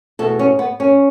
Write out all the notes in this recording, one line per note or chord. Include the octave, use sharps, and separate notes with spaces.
E2 B2 A3 A4
C#4
B3
C#4